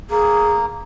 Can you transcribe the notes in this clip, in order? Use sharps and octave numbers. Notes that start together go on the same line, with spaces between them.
A#3 G#4